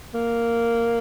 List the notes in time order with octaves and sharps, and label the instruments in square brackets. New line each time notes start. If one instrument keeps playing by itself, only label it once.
[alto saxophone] A#3